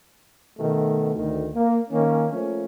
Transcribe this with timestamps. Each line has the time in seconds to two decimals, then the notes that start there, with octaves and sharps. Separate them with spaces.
0.58 B2 D#3 A3
1.16 D2 D#3
1.54 A#3
1.90 D#3 A#3 C#4
2.31 F3 A3 A#3 C#4